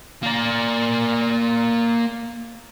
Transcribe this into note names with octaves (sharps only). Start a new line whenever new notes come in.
A#3 D5